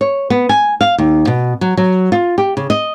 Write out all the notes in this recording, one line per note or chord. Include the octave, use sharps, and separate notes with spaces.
C#5
B3
G#5
F5
D#2
B2
F#3
F#3
F4
G4
C#3
D#5